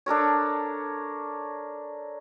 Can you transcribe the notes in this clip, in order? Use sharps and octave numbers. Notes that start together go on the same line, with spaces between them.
D4 A4 A#4 C#5